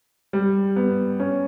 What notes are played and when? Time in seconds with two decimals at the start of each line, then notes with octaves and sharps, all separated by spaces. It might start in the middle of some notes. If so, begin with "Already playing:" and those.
0.33 G3
0.76 B3
1.20 C#4